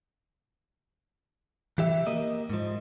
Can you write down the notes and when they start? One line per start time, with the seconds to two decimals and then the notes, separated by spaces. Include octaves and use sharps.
1.78 E3 G4 E5
2.07 A#3 D#5
2.50 G#2 F3